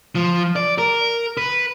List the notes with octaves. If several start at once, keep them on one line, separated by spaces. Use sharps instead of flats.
F3
D5
A#4
B4